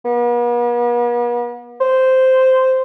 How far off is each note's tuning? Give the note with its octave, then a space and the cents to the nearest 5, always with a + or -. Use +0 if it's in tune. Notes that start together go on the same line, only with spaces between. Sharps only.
B3 -45
C5 -10